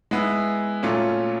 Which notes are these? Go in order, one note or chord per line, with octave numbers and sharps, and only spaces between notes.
G#3 B3 E4
A#2 F#3 A3 C#4 F4